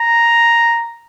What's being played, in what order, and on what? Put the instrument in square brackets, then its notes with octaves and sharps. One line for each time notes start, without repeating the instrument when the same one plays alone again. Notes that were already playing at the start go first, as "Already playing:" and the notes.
Already playing: [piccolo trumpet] A#5